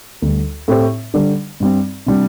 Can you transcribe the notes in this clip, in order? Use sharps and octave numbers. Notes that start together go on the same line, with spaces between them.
D2 D3 G3
A2 A3 C4 G4 C5
D3 G3 D4 A4 D5
G2 G3 C4
C3 G3 D4